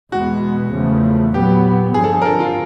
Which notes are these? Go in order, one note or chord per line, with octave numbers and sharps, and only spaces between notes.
E2 B2 G#3 B3 F#4
E2 C#3 F3 A3
A#2 F#3 B3 G4
G2 D3 F3 G#4
A4
G#4
A#4
A4
F4